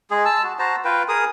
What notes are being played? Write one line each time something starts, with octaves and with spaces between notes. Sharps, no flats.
G#3 G#4
A5 E6
F#4
F#4 C5 A5 A#5
F4 B4 G5
G#4 A#4 D#6